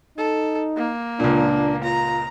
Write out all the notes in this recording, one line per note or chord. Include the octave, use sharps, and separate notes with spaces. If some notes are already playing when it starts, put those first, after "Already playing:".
D#4 A4
A#3
C#2 A#2 D4
F4 A#5